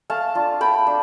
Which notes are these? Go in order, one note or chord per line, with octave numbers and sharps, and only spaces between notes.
A3 F5 A5
D4 F4
A3 G5 B5
D4